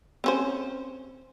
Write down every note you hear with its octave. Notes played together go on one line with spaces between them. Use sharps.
C4 C#4 C5